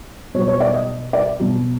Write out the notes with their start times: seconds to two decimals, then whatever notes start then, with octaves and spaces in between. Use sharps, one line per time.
0.34 B2 C#5
0.38 F#3
0.48 C#5
0.61 D5
0.74 D#5
1.13 D5
1.40 B2 F#3